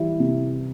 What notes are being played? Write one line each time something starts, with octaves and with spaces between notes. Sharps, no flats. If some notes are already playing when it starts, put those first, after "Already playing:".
Already playing: E3 G3 E4
C3